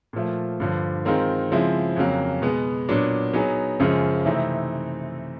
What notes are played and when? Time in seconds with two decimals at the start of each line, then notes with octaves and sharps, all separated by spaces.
0.13 A#2 F3 A3
0.60 G2 D3 F3
1.05 D#3 G#3 C4 F4 A#4
1.51 C#3 F3 G#3 C4 E4
1.96 F2 C#3 F#3 A#3
2.42 B2 G#3 B3
2.89 A#2 F#3 B3 D4
3.33 F#3 B3 D#4 G#4
3.79 F#2 C#3 F3 G#3
4.25 C3 E3 A3 C4 D#4